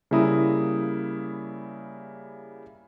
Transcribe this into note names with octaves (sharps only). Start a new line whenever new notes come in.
C#3 G3 A#3 E4 A#5 D#6